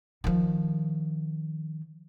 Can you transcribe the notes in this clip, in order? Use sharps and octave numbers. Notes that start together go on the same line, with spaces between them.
D#3 F3